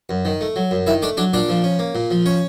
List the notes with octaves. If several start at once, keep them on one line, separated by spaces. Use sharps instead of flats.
F#2
D#3
A3
F#3
F#2
D#3 E4 E5
A3 D4 D5
F#3 D4 D5
A#2 D4 D5
F3
C#4
A#3
A#2
F3
C#4 C#5